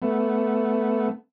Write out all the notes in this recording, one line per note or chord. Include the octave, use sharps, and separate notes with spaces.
A3 B3